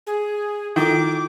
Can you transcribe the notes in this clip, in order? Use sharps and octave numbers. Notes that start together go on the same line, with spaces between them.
G#4
D#3 E4 F4 A4 D6